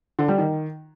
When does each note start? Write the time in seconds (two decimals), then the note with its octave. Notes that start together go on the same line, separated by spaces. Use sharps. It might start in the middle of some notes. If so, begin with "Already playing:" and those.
0.19 D3
0.28 G3
0.38 D#3